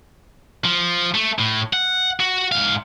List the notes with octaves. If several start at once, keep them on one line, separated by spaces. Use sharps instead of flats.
F3
A3
A2
F#5
F#4
G#2 F5